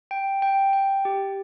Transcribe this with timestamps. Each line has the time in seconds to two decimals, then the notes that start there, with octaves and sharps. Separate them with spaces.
0.11 G5
0.42 G5
0.73 G5
1.05 G4